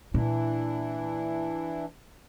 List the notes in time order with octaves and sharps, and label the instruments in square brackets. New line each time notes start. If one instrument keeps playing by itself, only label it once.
[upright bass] A#2 [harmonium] E3 D4 E4